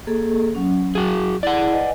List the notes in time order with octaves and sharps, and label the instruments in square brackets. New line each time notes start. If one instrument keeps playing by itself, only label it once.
[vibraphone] A#3 G#4 A4
F#3 C#4
[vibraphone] F#3 [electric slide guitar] F#4 G#4
[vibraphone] E4 G#4 [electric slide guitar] D5 F#5
[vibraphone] B4 D#5 G#5